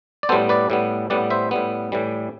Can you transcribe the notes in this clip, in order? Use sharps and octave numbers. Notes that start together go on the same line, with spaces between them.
D5
A2 G3 B3 A4 C5
B4 D5
A2 G3 B3
A2 G3 B3 D5 F#5
C5 E5
A2 G3 B3
A2 E3 G3